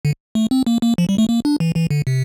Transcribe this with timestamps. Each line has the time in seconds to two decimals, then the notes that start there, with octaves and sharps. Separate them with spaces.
0.05 D3
0.35 A3
0.51 C4
0.67 A#3
0.82 A#3
0.98 F3
1.09 G3
1.18 A3
1.29 A#3
1.45 D4
1.60 E3
1.76 E3
1.90 D3
2.07 C3